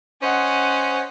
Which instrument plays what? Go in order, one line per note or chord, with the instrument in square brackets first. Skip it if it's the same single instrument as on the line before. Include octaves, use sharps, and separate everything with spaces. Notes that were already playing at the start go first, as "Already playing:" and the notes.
[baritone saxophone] C#4 [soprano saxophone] C5 [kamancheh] D#5 F#5